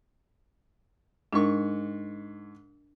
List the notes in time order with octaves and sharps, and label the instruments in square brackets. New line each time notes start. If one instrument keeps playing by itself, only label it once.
[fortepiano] G#2 C#6 [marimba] D4 A#4